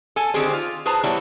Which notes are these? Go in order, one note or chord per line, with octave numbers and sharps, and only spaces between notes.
A4 G#5
D3 D#3 C4 G4 G#4 C5
F4
G#4 B4 C5 A5 A#5
E3 G3 B3 E4 C#5